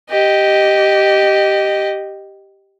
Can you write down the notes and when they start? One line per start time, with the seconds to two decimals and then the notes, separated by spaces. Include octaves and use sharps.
0.10 G4 D#5